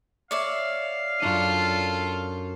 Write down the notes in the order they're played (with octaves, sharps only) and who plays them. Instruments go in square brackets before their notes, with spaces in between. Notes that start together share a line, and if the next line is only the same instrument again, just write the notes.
[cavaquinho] C#5 D5 E5 [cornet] F5
[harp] F#2 D4 D#7 [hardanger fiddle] F4 A4